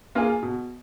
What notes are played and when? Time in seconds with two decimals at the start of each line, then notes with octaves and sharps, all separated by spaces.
0.15 A#3 F4 G#4
0.42 B2